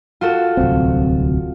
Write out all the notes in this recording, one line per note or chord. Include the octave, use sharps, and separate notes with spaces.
F4 F#4 A4
D1 C2 C4